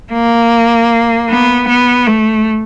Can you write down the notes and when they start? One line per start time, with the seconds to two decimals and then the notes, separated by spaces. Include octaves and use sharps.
0.13 A#3
1.29 B3
1.68 B3
2.07 A3